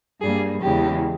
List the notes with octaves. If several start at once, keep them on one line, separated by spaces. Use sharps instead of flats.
G2 G3 A#3 G#4
E2 C#3 G#3 G4